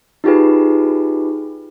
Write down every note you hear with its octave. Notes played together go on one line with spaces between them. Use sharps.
D#4 F4 G4 G#4 B4